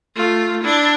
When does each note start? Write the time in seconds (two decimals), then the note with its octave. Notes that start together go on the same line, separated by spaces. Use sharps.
0.15 A3 F4
0.63 D4 E4